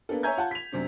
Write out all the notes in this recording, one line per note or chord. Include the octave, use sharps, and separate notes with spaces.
A#3 B3 D4 A4
C#5 E5 G#5 A#5 G6 G#6
F4 F#5 A5
B6 F7
F#2 C3 C4 D4